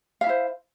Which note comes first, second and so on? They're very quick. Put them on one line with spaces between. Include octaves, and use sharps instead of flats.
F5 E5 E4 C5